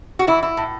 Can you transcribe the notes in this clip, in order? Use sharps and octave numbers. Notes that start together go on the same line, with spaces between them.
F#4
E3 E4
E4
A2